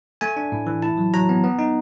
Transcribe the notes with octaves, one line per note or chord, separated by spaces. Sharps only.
A3 G#5
D4
A2
E3
E4 A5
F#3
F#3 A#5
B3
B3
D#4